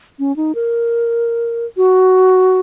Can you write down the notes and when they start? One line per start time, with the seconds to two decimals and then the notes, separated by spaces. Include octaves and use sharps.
0.19 C#4
0.36 D#4
0.55 A#4
1.77 F#4